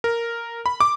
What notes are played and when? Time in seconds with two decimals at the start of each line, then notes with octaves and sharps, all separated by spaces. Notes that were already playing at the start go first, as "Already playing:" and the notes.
0.04 A#4
0.66 B5
0.81 D6